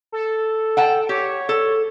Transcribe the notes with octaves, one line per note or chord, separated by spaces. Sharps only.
A4
F#5 G5 A5
G4 C#5
A4